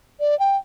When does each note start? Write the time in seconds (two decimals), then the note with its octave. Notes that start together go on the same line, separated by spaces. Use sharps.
0.20 D5
0.39 G5